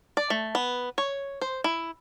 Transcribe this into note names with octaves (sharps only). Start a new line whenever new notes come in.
D5
A3
B3
C#5
C5
E4